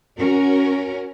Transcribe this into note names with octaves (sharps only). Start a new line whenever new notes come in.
C#4 F#4 A#4